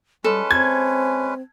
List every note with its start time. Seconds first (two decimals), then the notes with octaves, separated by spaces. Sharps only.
0.24 G3 G#3 C#4 A4 B4
0.51 C4 G#6